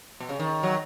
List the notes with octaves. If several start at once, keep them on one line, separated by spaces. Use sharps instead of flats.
B2
C#3
D#3
F#3